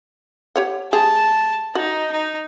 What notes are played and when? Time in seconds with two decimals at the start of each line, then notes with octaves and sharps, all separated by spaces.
0.56 G4 C#5 F#5
0.93 G#3 G4 G#4 A5
1.75 D#4 F#4
2.12 D#4